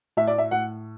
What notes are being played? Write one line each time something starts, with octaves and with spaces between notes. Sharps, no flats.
A2 E5
D5
E5
A2 F#5